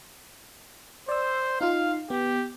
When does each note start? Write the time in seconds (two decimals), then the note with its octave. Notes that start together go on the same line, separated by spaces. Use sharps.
1.09 C5 D5 E6
1.61 D#4 F4 F5
2.10 B3 G4